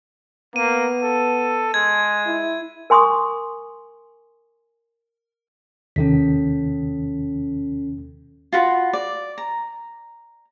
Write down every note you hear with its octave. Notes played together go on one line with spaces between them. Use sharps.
A#3 B3 D#7
A4
G#3 G#6
E4
A#4 G#5 C6 C#6 D#6
D#2 C3 D#3 C#4 A4 B6
F4 F#4 B5
D5
A#5